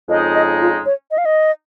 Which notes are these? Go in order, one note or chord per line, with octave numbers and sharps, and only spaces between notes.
F2 C#3 G#3 D#4 D#5
D#5
F4
C#5
D#5
F5
D#5